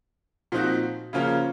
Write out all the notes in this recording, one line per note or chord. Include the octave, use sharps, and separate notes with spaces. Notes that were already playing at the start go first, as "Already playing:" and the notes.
A#2 F3 C4 D#4 F#4
C#3 F3 A#3 C#4 F4